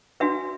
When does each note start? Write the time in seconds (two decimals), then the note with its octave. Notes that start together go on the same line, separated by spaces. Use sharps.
0.20 D4 F#4 B4 E5